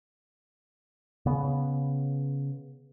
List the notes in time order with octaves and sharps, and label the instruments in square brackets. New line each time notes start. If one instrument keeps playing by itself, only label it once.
[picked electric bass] C#3 B3